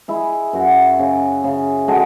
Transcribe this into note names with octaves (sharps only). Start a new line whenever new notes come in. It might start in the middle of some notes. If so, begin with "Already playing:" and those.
G#3 E4
F#2 F#4
C#3
C#3
G#3 F#4 A4